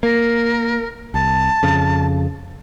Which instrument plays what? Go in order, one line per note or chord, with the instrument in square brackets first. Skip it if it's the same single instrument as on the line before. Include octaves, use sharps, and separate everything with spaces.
[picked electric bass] A#3 [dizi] A#4
[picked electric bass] C2 [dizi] A5
[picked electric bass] F2 C#3